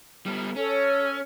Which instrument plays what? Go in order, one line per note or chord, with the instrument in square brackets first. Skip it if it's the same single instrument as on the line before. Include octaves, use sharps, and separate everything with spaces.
[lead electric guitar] G3 B3
[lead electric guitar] C#4 [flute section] A4 C#5